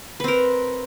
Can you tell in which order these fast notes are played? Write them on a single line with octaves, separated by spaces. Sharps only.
B4 C4 A#4